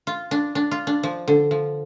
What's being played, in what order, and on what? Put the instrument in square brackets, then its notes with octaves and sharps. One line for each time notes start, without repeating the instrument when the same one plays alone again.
[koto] F4
D4
D4
F4
D4
F3
D3
F3